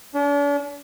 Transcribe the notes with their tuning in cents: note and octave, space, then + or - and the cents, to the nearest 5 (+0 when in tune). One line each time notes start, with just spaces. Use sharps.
D4 -45